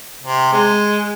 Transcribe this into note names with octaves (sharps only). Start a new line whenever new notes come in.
C3
G#3